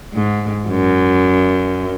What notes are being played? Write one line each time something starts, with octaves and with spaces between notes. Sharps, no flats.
G#2
F#2